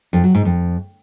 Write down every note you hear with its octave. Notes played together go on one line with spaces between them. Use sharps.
F2
F#3
G#2
F2